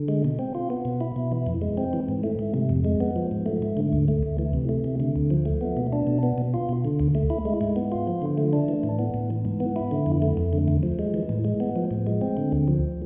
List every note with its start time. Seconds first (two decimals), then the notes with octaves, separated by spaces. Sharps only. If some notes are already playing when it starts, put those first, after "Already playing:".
Already playing: D3
0.08 G#3
0.25 B2
0.39 C4
0.55 F4
0.70 B3
0.85 B2
1.01 E4
1.16 B2
1.32 E3
1.47 F2
1.61 G#3
1.77 C4
1.93 E3
2.09 G#2
2.23 A3
2.39 G#2
2.54 C3
2.69 F2
2.85 G#3
3.00 B3
3.16 F3
3.31 G#2
3.46 A3
3.62 G#2
3.77 D3
3.93 D2
4.08 A3
4.23 D2
4.39 E3
4.53 C3
4.69 A3
4.84 C3
5.00 D3
5.16 D2
5.30 F3
5.46 A3
5.61 B3
5.77 B2
5.93 D4
6.07 B2
6.23 B3
6.38 B2
6.54 F4
6.69 B2
6.85 D3
7.00 D2
7.15 A3
7.30 E4
7.45 G#3
7.61 G#2
7.76 B3
7.92 F4
8.07 F3
8.22 D3
8.38 A3
8.53 D4
8.68 E3
8.83 A2
8.99 B3
9.14 A2
9.30 E3
9.45 G#2
9.60 B3
9.76 E4
9.91 D3
10.06 F2
10.22 A3
10.37 F2
10.53 D3
10.68 E2
10.83 F3
10.99 G#3
11.14 E3
11.29 A2
11.45 G#3
11.60 B3
11.76 F3
11.91 A2
12.07 G#3
12.21 C4
12.37 D3
12.52 D2
12.68 F3